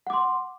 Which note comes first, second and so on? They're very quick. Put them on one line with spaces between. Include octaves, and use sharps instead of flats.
F#5 D6 C6